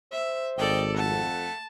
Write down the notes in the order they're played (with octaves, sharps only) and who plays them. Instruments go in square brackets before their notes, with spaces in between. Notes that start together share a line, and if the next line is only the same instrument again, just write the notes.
[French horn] C5 [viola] E5
[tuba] G#1 [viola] A4 D5 [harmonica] D#5 G5
[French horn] F2 [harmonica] A3 F#5 [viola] A5